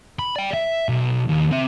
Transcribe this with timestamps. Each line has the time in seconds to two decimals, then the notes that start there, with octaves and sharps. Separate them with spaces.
0.19 B5
0.36 D5 G5
0.54 E5
0.89 B1
1.29 D#2
1.52 C4 E5